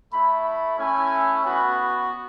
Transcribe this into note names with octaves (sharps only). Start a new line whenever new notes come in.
A3 E4 B5
B5
A3 C#4 E4 G#5
B3 F#4 B5